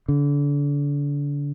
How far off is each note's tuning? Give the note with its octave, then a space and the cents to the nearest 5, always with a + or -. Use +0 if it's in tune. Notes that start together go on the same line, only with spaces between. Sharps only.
D3 -35